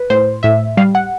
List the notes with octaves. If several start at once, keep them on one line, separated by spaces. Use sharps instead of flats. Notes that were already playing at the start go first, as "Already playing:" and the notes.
Already playing: B4
A2 C5
A2 E5
G3 F5
F#5